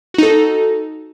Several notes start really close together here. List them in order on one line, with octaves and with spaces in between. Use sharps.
F#4 D#4 A4